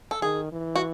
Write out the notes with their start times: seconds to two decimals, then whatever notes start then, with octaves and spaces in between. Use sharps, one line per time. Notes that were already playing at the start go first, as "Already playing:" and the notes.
0.11 A4
0.22 D#3 G#4
0.52 E3
0.76 F#4